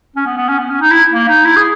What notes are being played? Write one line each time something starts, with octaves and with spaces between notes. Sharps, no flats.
C#4
B3
B3
C#4
B3
C#4
D#4
E4
A#3
D#4
E4
G#4